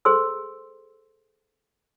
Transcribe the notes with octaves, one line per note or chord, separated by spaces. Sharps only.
G#4 A4 C5 C6 E6